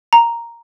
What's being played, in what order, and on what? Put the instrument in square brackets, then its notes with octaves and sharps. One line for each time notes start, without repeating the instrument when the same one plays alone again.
[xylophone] A#5